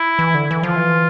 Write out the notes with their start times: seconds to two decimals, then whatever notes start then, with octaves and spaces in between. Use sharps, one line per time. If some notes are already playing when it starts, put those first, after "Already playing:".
Already playing: E4
0.19 E3
0.34 D3
0.51 E3
0.63 F3 F4
0.76 E3